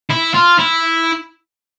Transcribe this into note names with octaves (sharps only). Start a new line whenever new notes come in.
E4
F4
E4